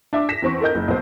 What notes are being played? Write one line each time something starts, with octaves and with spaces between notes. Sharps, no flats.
D4 E5 D6
A#6 B6 E7
E2 C4 C#6
A4 A#4 D#5 G6
F#1
B1 C5